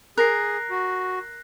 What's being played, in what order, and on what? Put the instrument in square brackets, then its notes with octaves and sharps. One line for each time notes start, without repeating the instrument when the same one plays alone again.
[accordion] G#4 [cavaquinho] A#4 [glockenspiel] F#6 A#6 C7
[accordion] F#4